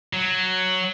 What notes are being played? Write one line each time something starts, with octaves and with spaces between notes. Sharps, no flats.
F#3